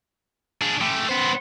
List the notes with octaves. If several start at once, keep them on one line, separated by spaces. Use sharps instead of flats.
D4 G#4
A3 G4
B3 C5